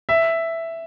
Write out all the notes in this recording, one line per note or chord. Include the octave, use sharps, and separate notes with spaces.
E5